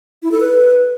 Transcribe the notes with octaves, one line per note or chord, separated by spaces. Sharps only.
E4
A4
B4